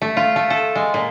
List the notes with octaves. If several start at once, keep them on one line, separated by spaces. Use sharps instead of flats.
A3
F4
A3
A4
G#3
A#2